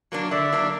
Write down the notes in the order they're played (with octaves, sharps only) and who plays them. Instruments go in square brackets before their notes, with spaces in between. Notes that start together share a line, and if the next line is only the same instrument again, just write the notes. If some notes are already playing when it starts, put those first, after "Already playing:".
[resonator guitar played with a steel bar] F#3 A#3 D4
[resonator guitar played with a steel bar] D3 [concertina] D5 E5
[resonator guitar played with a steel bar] F#3 A#3 D4